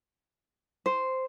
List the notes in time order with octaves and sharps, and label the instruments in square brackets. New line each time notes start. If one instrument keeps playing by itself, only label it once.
[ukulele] C5